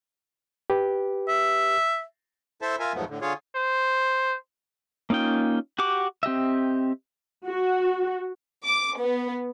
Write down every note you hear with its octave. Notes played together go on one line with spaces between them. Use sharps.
G4 B4
E5
E4 A4 C5 E5 A5
F4 A#4 E5 G#5
E2 G#2 F3 F#3 A3 B3
A2 D3
D3 F4 G#4 C#5
C5
A#3 C#4 D#4 F4 G5
F#4 G4 F#5 D6
C4 G4 D#5 E5
F#4
D6
B3